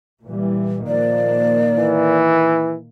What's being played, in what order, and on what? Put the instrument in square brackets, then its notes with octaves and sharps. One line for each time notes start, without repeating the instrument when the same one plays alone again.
[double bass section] A#2 E3 G3
[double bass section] A#2 D#3 A#3 [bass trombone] F3 [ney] D5
[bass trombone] E3